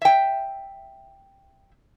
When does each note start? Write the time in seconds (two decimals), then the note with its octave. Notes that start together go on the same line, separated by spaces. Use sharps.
0.02 E5 G5